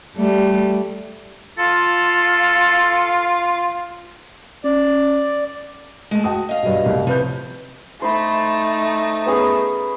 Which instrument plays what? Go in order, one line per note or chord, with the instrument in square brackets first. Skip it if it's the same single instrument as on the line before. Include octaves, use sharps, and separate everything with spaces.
[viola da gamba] G3 A3
[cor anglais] F4 [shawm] A4
[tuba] C#4 [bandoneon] D5
[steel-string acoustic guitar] G#3 A3
[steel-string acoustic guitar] F#4 [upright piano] G5 A5 D#6
[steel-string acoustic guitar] D#5 F5
[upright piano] B1 G2
C2 A2
[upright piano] C3 B4 G6 [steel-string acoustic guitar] F3 C#5
[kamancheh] A3 D#4 [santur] C5 B5
[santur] B3 C#4 G#4